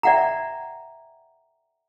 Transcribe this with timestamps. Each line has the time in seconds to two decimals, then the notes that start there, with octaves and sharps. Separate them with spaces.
0.03 D5 E5 F#5 G5 A#5